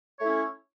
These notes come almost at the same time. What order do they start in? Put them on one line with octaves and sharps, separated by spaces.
C#5 A3 E4 C#4